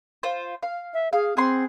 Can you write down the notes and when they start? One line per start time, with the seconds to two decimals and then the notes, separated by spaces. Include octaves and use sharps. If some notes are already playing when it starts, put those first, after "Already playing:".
0.23 F4 C5
0.63 F5
0.94 E5
1.13 G#4 F5
1.37 C4 G#4 F#5 C6